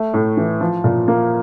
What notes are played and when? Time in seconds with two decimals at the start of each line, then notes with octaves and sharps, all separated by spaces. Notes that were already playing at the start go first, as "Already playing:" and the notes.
Already playing: A3
0.14 A2
0.37 E3
0.60 F3
0.84 A#2
1.08 A#3